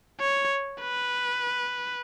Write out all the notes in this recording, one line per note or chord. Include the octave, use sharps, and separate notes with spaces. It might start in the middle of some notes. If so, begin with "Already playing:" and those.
C#5
B4